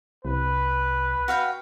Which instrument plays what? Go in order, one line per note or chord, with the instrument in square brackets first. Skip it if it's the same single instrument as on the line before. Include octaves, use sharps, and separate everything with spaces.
[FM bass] C2 [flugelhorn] B4
[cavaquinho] F#4 F5 G5